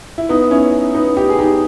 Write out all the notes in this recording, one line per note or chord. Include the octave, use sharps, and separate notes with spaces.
E4
B3 D#4
C#4 E4
B3 D#4
D#4 G4
G#4
D#4 G4